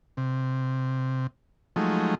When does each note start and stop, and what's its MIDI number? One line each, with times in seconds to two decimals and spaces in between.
0.17 1.27 48
1.76 2.15 53
1.76 2.15 54
1.76 2.15 56
1.76 2.15 57
1.76 2.15 63